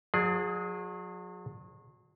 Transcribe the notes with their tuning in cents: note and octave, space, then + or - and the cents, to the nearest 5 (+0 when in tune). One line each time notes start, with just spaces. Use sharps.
F#3 -40 G#4 +0 D5 +30